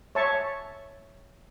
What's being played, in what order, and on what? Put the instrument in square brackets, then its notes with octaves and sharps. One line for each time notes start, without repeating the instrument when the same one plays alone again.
[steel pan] C#5 E5 A5 C#6